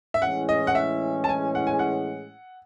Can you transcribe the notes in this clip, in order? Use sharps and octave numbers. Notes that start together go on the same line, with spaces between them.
E5
A2 E3 G#3 C#4 G#4 F#5
D#5
F#5
E5
A5
G#5
F#5
G#5
F#5